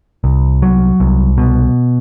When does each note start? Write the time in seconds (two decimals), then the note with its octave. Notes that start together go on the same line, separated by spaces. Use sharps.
0.24 C2
0.62 F#3
1.00 C2
1.38 B2